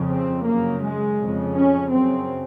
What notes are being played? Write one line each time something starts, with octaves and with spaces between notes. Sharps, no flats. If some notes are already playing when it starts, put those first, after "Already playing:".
Already playing: F2 C#3
C4
F#2 C#3 A#3
G#3
F2 C#3
C#4
F#2 C#3 C4